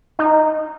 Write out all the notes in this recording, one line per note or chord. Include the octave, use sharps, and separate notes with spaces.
D#4